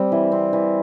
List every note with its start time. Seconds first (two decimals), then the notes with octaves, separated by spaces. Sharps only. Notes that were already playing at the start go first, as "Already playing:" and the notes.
Already playing: G3 C4
0.12 E3
0.32 C4
0.53 E3